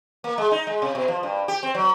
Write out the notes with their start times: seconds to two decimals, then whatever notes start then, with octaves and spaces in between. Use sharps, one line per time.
0.24 A#3
0.38 G#3
0.51 D#4
0.67 G#3
0.82 C3
0.95 B2
1.08 F3
1.23 G2
1.48 G4
1.63 C4
1.75 F#3